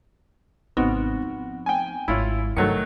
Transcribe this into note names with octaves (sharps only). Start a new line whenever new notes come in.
G#1 C3 B3 C4 D#4 F#4
F3
G5 G#5
G#1 E4 F4 C#5
F1 G2 D#3 F#3 A3 C#7